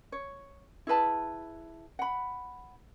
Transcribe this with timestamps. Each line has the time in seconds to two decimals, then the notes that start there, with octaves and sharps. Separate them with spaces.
0.12 C#5
0.87 E4 G#4 B4 A5
1.99 F#5 B5